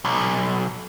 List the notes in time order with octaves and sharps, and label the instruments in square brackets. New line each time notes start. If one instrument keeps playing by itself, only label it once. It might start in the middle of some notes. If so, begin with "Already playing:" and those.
[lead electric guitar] B1